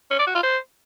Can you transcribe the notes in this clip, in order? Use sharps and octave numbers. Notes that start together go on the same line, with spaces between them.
C#4
D5
F#4
F4
C5